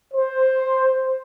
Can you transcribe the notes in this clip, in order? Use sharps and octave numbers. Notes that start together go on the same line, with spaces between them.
C5